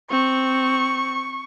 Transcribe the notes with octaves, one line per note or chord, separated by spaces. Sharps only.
C4 C#6